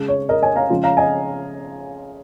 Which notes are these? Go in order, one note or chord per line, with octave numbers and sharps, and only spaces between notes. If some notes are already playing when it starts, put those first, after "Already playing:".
Already playing: C#3 G#3 C#4
C#5
A#4 D#5
D#5 G#5
F5 A#5
C#3 F3 G#3 F4
F5 A#5
D#5 G#5